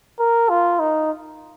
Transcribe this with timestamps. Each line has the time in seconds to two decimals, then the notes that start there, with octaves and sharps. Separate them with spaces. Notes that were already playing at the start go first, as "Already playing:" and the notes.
0.20 A#4
0.49 F4
0.80 D#4